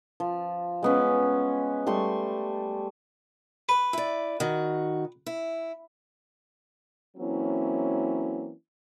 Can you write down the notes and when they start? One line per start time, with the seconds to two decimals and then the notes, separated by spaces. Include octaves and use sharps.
0.20 F3
0.83 G#3 B3 C#4
1.87 G3 A3 C6 C#6
3.69 B4
3.93 E4 D5
4.40 D#3 F#4
5.26 E4
7.17 E3 F#3 A#3 C4 C#4 E4